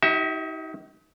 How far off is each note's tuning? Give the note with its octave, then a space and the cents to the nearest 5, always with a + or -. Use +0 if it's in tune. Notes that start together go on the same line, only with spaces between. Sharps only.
D#4 +35 G4 -45 E5 -15